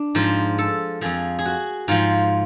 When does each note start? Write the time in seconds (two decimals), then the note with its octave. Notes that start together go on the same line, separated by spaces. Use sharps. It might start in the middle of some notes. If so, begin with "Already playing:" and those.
Already playing: D4
0.15 G#2 F3 F4
0.58 A4
1.01 F2 F3 G#4
1.39 G#4
1.46 F#4
1.88 G#2 F3 F4